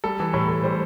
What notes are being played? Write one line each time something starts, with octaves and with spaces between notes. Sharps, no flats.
G3 A4
E3
A2
A2
G3 C5